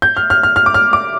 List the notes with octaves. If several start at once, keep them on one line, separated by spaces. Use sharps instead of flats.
G6
F6
F6
F6
F6
D6
F6
D6